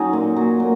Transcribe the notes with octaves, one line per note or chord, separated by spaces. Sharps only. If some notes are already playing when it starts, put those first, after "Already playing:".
Already playing: F#3 C#4 D#4
A#2
F#3
A#2